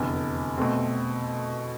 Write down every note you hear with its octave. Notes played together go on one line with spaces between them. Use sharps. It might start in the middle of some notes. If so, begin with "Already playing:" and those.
Already playing: F1 E2 D3
B2 A3 C4